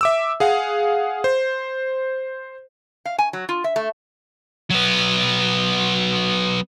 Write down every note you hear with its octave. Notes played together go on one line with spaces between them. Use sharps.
E5 D6 E6
G#4 F5 F#5
C5
F5
G#5
F#3
F4
E5
A3
F#3 B3